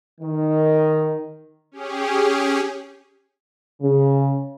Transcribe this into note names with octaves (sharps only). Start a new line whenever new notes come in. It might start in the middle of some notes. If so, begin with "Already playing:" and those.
D#3
C#4 G4 G#4
C#3